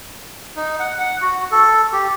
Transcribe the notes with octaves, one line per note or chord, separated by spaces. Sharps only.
D#4
F#5
F#5
F#4
A4
G4